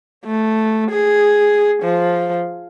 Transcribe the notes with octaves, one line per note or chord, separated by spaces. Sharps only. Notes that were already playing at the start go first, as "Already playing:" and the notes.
A3
G#4
F3